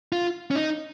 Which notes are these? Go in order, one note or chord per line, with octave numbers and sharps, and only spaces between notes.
F4
C#4
D#4